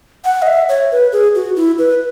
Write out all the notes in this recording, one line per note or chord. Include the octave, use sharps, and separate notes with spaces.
F#5
D#5
E5
C#5
B4
G#4
F#4
E4
B4